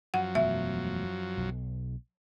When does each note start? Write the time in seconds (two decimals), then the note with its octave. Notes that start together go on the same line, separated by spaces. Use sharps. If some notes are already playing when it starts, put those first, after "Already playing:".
0.14 F#2 F3 F#3 F#5
0.35 E1 B2 A3 E5
1.37 B1